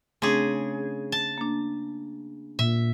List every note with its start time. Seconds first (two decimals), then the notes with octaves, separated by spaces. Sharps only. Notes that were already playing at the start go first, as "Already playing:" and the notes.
0.22 C#3 A3 C4 D4 G#4
1.12 A5
1.38 A#3 D4
2.59 A#2 E5